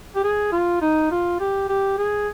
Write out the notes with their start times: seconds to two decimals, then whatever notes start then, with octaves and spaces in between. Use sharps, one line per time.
0.15 G4
0.23 G#4
0.52 F4
0.81 D#4
1.11 F4
1.40 G4
1.69 G4
1.98 G#4